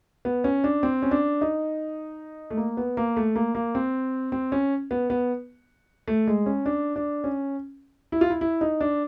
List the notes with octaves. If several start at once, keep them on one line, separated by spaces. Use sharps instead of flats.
B3
C#4
D4
C4
C#4
D4
D#4
A3
A#3
B3
A#3
A3
A#3
A#3
C4
C4
C#4
B3
B3
A3
G#3
C#4
D4
D4
C#4
E4
F4
E4
E4
D#4
D4